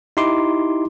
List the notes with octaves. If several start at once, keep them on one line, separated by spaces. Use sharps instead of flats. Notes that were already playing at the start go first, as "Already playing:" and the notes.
D#4 E4 G4 C6 D6